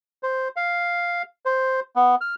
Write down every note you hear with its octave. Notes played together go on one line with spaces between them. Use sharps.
C5
F5
C5
B3
F6